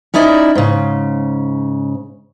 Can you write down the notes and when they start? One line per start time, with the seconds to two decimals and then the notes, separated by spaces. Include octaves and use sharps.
0.14 C#4 D#4 E4 D5 D#5
0.55 G#2 C#3